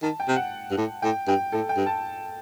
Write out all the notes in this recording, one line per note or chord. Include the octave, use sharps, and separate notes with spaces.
D#3 A5
G5
C3
F#5
G2
A2
A2 G5
G2 G5
A2 A4
G5
G2
A5